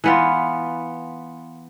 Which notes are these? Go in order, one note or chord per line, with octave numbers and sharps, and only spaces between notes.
E3 B3 F4